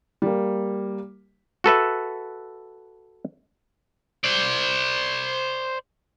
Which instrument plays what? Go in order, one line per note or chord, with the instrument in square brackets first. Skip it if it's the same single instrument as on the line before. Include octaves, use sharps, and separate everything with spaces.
[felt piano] G3 A#3
[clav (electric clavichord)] F#4 A4 B4 E5
[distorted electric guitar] C5 D5